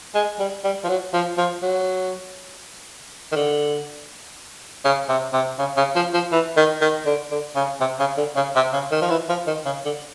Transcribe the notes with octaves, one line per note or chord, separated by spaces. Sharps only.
G#3
G3
G3
F3
F#3
F3
F3
F#3
D#3
D3
C#3
C3
C3
C#3
C#3
F3
F3
E3
D#3
D#3
D3
D3
C#3
C3
C#3
D3
C#3
C3
C#3
D#3
F3
E3
F3
D#3
C#3
D3